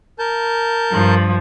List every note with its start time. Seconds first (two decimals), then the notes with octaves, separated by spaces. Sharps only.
0.19 A#4 A5 G6
0.91 G2 F3